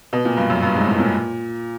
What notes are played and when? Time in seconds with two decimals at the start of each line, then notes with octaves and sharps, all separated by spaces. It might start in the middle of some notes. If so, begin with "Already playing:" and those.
0.13 B2
0.25 A#2
0.37 G2
0.50 F#2
0.63 G2
0.75 G#2
0.87 A2
0.99 A#2